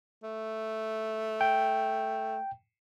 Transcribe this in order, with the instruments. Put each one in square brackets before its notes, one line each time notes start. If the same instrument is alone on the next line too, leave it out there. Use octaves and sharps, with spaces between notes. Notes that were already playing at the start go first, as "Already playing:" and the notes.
[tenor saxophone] A3
[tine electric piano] G5